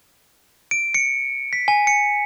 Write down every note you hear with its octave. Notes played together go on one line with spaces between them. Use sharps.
D7
C#7
B6
G#5
C#7